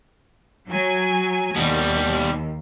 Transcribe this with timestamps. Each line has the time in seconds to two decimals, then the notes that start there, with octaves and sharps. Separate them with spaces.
0.70 F#3 G#5
1.56 D#2 B2 G3